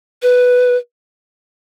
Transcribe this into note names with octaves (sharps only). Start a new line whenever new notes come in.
B4